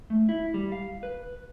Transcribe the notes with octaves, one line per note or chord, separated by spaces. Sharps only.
A3
E4
G3
F5
B4